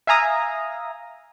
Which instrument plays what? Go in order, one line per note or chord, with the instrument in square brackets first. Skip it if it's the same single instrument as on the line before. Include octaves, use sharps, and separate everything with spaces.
[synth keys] E5 F5 G#5 A#5 D#6